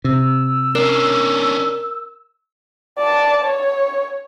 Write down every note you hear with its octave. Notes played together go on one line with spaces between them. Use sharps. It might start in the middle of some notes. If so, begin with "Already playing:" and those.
C3 E6
C#4 D4 A#4
D5 A5
C#5